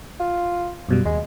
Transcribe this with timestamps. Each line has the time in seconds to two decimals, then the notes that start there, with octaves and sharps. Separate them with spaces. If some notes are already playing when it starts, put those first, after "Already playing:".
0.20 F4
0.89 F#2 B2 G3
1.05 D#2 G#3